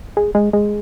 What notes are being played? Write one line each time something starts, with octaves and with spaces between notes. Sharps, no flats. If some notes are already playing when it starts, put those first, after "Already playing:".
G#3
G#3
G#3